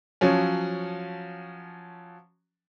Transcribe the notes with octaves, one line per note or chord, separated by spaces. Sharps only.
F3 F#3 C#4